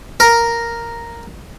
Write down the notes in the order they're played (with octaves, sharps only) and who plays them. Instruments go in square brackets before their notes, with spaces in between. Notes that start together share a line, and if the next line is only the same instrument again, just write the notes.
[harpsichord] A#4